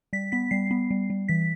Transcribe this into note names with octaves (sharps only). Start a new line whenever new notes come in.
G3 B6
B3 B6
G3 C7
B3
G3
G3
E3 B6